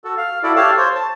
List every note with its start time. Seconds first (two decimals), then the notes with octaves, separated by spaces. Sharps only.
0.04 F#4 A4
0.17 F5
0.43 E4 F#4 A4 D5
0.56 G4 A4 C#5 F5 A5
0.77 C5 C#5
0.95 A5